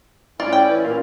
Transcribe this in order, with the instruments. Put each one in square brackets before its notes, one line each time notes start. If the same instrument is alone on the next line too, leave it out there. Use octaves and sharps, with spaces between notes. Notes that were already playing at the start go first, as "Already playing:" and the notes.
[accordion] A2 C#4 E4 [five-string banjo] F4 [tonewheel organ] D5
[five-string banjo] G5
[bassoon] E3
[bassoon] A#2 [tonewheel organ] F4